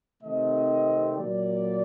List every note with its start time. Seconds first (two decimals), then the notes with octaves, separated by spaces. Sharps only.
0.23 C3 D#3 A3 C4 D#5
1.17 A#2 F#3 A#3 D5